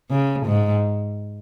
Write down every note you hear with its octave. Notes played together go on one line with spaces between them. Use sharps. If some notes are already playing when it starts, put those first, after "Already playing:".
C#3
G#2